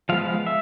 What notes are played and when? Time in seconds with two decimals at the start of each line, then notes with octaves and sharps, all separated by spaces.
0.09 F3 G#3 B3 F5
0.21 F5
0.47 E5